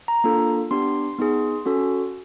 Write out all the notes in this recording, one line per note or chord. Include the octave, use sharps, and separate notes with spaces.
A#5
A#3 D4 F4 A4
B3 D4 G4 C6
B3 D#4 G#4
C#4 F#4 A4